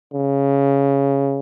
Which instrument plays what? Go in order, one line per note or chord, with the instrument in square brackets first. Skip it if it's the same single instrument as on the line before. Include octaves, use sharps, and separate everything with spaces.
[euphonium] C#3